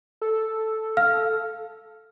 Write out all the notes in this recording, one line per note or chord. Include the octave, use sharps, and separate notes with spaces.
A4
F5 F6